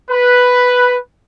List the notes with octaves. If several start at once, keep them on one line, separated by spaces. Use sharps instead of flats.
B4